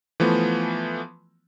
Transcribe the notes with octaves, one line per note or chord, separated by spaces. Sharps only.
E3 F3 A3 B3